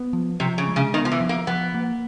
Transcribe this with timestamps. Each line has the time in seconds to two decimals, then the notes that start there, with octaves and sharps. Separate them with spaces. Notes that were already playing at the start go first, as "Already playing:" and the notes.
Already playing: B3
0.13 F3
0.40 C3 F3
0.58 C#3
0.67 G#3
0.76 C#3
0.94 D#3 B3
1.05 F3
1.12 E3
1.20 F3
1.29 A#3
1.47 F3 B3
1.74 A#3